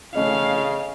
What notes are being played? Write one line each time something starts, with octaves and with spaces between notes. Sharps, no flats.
C#3 A3 C#4 D#5 F5